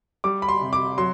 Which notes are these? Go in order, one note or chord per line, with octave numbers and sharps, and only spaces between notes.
G3 D6
B5
C6
C3
D6
F#3 C6